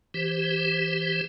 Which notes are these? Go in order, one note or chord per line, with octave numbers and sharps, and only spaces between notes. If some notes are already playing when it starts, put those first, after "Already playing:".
E3 G4 C5